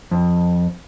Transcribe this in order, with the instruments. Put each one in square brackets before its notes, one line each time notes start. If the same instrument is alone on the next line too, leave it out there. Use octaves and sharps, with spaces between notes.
[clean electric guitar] F2